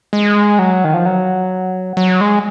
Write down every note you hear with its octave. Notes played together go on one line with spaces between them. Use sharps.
G#3
F#3
D#3
F3
F#3
F#3
G#3